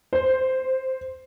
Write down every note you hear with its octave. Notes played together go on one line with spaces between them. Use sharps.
C5